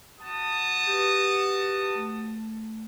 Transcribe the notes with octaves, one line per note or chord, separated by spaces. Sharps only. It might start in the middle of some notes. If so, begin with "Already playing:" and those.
F#4 A5 D#6
G4 B4
A3